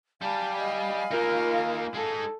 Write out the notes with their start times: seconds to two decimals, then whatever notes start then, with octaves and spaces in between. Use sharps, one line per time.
0.22 G3 G4 F5 G#5 A5 B5
0.60 D#5
1.11 A#3 D#4 F4 A#4
1.94 G#3 D#4 A4